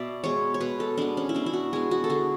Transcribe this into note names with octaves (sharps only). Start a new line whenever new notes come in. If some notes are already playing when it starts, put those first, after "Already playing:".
Already playing: B2 D5 E5
G#3 B3 C#5
C#5
B2 B4
A4
G#3 B3 D4
C#4
E4
B2 D4
E4
F#4
G#3 B3 G#4
F#4
A4
D3 G#4